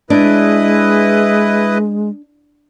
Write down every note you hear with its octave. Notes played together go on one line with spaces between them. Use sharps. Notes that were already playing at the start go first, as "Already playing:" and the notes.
G#3 D4 E4 B4 D#5